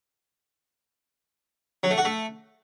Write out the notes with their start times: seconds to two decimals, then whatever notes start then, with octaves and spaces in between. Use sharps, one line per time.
1.83 F#3
1.91 A3
1.98 F#4
2.05 A3